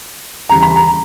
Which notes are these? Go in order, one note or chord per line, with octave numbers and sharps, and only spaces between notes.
D#2 C#3 E3 G3 A#5
B5
A#5